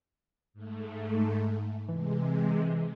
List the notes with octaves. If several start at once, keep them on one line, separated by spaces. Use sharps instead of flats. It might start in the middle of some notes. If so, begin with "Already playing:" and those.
G#2 A3
C3 E3 G#3